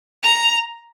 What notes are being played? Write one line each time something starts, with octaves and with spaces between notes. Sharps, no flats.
A#5